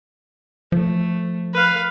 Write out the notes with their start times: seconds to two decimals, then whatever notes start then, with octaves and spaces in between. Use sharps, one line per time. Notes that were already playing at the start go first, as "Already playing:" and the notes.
0.72 F3 A3
1.54 B4 F5